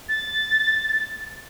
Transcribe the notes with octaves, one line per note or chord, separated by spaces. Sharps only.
A6